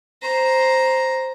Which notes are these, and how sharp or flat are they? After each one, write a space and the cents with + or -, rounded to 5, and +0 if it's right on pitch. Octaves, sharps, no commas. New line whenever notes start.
C5 +0 A#5 +5